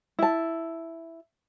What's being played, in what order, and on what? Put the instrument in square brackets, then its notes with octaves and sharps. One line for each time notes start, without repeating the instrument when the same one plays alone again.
[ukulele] E4 A5